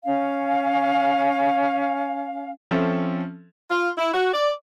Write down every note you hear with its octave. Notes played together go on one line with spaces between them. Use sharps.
C#4 F5
F3 C4 C#4 A4 E5
F4
E4
F#4
D5